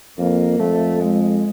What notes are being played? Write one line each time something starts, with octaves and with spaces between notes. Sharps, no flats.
F2 A#3
F2 A3
G#3